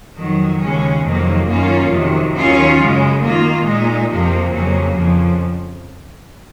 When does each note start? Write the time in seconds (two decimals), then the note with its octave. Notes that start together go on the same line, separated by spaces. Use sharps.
0.16 F2 D#3 F#3
0.60 D#2 C#3 G#3 C#4
1.03 F2 C3 D#3 F#3 A#3
1.47 F#2 D#3 A#3 C#4 F4
1.91 F2 C3 D#3 F#3
2.34 D#2 D#3 F#3 C#4 F4
2.79 F#2 C#3 G#3
3.22 D#3 A#3 F4
3.66 A#2 G#3 D#4
4.09 F2 C3 F3 A#3
4.53 F2 C#3 F#3 A#3
4.96 F2 C#3 F3